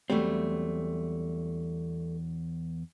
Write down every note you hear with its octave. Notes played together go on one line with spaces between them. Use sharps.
E2 F#3 G3 A3 C4